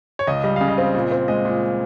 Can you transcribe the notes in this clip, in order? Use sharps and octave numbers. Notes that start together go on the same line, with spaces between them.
C#5
C#2 D#5
G3 D#5
C#3 F5
D#5
C4
A#2
C4
G#3 D#5
A#2